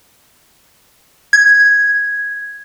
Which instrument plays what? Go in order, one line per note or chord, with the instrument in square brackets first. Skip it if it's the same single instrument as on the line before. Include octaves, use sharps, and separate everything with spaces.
[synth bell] G#6